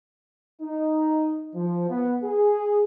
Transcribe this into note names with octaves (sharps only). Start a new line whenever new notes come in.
D#4
F3
B3
G#4